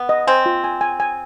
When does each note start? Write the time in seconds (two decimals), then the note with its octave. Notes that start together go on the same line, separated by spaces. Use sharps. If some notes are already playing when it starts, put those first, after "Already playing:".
Already playing: B3
0.09 D#5
0.27 C4 G#5
0.46 F4
0.64 G#5
0.81 G#5
1.00 G#5